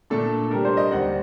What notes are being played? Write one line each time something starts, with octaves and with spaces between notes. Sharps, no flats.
A#2 A3 D4 A4
C3 G3 D4 A#4
C5
D#5
D#2 D3 G3 C4 F#5